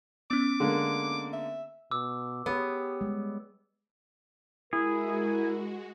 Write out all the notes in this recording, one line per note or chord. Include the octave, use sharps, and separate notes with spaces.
B3 C#4 D6
D3 G#3 A#3
E5
B2 D6 E6
B3 G4 G#4 C#5
G3 G#3
G#3 E4 F#4 G#4 A#4